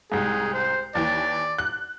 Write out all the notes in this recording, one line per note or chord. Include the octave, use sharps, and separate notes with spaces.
C2 G#2 G#4
C5
D#2 E3 D5
F#6